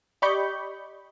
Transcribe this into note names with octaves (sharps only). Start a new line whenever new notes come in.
G4 D5 D#5 B5 C#6 G6